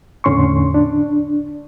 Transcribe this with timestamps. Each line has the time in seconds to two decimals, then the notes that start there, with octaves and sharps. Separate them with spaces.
0.24 E2 A2 D3 C#4 C6 C#6
0.74 D4